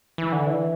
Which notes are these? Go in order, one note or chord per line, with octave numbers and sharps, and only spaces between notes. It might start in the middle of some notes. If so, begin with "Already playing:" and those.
E3
D3
E3